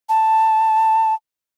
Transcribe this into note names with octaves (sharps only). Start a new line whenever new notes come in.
A5